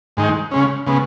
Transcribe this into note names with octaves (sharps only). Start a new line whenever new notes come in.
G#2 D#3 G#3 D#4
C#3 G#3 C#4
C#3 G#3 B3